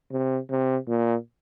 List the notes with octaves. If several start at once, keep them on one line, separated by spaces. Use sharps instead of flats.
C3
C3
A#2